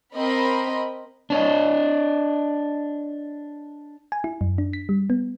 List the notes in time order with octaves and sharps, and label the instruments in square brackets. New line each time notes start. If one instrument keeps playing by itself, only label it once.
[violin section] C4 A#4 D#5 B5
[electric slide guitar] D4 C#5 D#5
[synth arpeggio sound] G#5
E4
F#2
D4
B6
G3
B3